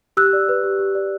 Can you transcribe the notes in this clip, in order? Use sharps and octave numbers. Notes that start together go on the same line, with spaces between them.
G4 E6 F#6
D5
B4
G4
G4
D5